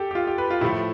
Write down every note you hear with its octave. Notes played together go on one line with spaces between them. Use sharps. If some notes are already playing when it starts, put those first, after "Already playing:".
Already playing: G4 A4
G4
F4
G4
B4
F4
A2 F3 A3 E4